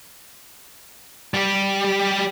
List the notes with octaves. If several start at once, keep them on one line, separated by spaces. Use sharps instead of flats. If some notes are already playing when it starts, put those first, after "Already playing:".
G3 G4